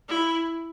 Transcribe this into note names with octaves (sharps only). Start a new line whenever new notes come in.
E4